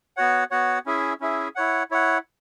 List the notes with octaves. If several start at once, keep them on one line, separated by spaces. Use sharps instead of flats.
B3 F#4 C#5 F#5
B3 F#4 C#5 F#5
C#4 E4 G#4 E5
C#4 E4 G#4 E5
E4 C#5 F#5
E4 C#5 F#5